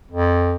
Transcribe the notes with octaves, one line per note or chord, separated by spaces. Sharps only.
F2